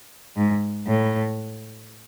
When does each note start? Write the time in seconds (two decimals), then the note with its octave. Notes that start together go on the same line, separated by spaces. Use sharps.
0.36 G#2
0.88 A2